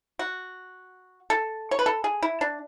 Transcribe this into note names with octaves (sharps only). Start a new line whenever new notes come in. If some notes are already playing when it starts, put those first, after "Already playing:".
F#4
A4
C#5
B4
A4
G#4
E4
D4